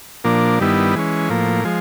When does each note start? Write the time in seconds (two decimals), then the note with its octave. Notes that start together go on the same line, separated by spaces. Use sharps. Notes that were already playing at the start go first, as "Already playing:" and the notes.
0.24 A#2 F3 A#3 D4
0.60 G2 D#3 G3 B3 E4
0.94 E3 G#3 C#4
1.30 A2 F3 A#3
1.65 F3 G#3